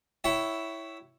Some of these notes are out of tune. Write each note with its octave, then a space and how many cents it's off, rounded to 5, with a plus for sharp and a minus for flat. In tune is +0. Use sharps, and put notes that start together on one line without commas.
E4 +0 C#5 +5 G5 -45